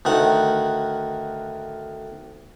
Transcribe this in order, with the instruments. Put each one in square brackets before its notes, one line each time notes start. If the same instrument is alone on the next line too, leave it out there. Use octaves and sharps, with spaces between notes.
[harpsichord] D2 D#3 F#5